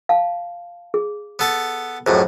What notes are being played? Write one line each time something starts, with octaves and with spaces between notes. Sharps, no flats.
F5 A5
G#4
B3 A4 A5
C#2 F#2 A2 C5